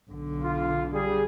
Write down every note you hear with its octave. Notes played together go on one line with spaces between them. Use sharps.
B1 D3
F4
G3 G#4